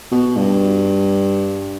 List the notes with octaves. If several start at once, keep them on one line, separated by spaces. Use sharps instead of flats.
B2
G2